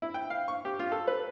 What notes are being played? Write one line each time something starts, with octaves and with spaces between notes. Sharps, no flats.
E4
G5
F5
C#6
G4
F4
A4
B4